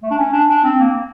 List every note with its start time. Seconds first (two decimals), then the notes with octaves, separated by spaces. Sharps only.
0.03 A3
0.11 D4
0.18 C#4
0.33 D4
0.49 D4
0.64 C4
0.80 A#3